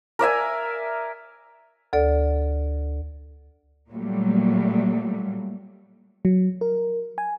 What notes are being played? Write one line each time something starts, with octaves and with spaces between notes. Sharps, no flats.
A#4 D5 E5 G#5
D2 A4 D5
A#2 F#3 G3 A3 A#3
F#3
A#4
G#5